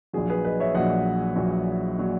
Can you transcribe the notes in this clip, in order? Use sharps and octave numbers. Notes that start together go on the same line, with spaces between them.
A#1 A#2 F#3 G#4
G#4 B4
B4 D#5
C#5 E5
A#1 A#2 F#3 D#5 F#5
A#1 A#2 F#3
A#2 F#3